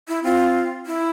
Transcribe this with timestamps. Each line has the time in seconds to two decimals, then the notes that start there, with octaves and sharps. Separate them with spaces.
0.08 E4
0.24 C4 F4
0.86 E4